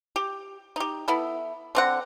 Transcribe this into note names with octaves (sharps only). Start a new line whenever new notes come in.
G4
D#4 G4
B3 E4 A4
D3 C4 F#5